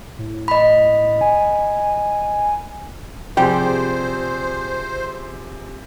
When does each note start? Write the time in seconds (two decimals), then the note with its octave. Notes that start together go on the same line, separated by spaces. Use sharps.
0.18 A2
0.48 D#5 B5
1.21 G#5
3.37 C3 F3 G3 G#4 C5 G5